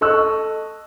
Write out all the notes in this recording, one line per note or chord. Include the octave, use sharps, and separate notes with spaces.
A4 D#5 C#6 E6 F#6